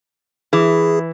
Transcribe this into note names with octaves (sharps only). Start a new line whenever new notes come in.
E3 G#4